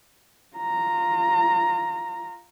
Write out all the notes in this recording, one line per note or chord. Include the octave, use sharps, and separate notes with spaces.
F4 A#5